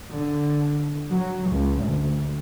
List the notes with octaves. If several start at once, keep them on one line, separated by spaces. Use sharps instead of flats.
D3
F#3
C#2
D2